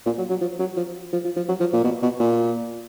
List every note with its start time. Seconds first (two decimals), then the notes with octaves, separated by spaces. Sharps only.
0.06 A#2
0.18 F#3
0.30 F#3
0.41 F3
0.59 F#3
0.77 F3
1.13 F3
1.24 F3
1.36 F3
1.48 F#3
1.60 F3
1.73 A#2
1.84 B2
2.02 B2
2.20 A#2